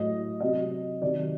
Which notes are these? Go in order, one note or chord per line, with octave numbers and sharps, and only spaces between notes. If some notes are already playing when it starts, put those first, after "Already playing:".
Already playing: A2 F#3 D#5
C3 F#3 D#5
C3 D#3 F#3 D5